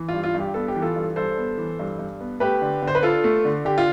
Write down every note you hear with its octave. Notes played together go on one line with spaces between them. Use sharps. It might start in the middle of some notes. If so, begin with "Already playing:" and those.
Already playing: E3
G2 F4
F4
G2
G4
B3 A4
G4
E3
F4 A4
G2
G2 A4 C5
B3
E3
G2
G2
B3
A3 G4 B4
D3
D3
C5
B4
D4 F4 A4
A3
D3
D3 G4
F4